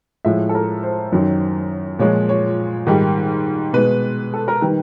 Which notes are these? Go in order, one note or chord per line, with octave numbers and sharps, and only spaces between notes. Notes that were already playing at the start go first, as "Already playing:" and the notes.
A2 F3 G#3 E5
A4
A#4
C5
F#2 D#3 F#3
A#2 F3 G#3 C#5
C#5
G#2 D#3 G3
B2 G#3 B4
A4
A#4
D#3 G3 B4